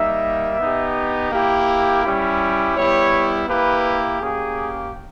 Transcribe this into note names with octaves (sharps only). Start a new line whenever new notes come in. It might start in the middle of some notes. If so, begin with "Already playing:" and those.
Already playing: G3 A#3 D#4 E5
B3 D#4 G4
A#3 E4 G4
G3 C#4 E4 G4
G3 B3 E4 G4 C#5
A#3 E4 G4 B4
A#3 C#4 G4 G#4